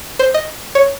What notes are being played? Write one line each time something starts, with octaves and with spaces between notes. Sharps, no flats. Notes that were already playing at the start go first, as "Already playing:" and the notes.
C5
D#5
C#5